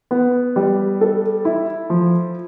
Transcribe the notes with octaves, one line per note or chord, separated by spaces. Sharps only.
B3
G3
A4
E4
F3